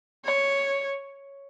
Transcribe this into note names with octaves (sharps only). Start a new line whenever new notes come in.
C#5